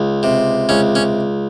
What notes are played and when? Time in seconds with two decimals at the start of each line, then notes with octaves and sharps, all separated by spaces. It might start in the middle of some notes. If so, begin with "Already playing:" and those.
Already playing: C#2
0.23 C3
0.69 C#2 C#4
0.95 C#4